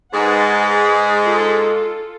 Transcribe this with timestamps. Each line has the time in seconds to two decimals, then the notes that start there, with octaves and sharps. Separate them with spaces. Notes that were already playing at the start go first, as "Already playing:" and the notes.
0.13 G#2 G#3 B4 F#5 G#5
1.24 F4 A4